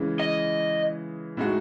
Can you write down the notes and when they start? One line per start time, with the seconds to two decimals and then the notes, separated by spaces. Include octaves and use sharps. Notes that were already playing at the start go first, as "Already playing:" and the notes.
Already playing: C#3 E3 G#3
0.20 D#5
1.37 A2 G#3 D#4 F#4